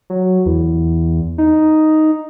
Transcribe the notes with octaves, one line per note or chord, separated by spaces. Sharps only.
F#3
E2
D#4